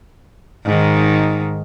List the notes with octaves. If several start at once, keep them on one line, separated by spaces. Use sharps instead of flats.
G#2 D#3